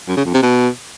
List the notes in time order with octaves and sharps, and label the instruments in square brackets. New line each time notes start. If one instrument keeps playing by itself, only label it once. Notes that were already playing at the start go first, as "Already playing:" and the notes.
[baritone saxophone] F#2
C#3
F2
C3
B2